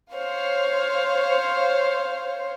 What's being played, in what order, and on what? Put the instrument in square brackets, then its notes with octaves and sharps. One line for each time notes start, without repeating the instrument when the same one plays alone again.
[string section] C5 C#5 F5